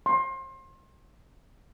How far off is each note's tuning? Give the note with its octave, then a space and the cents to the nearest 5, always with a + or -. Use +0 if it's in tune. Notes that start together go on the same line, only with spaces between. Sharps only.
C6 +30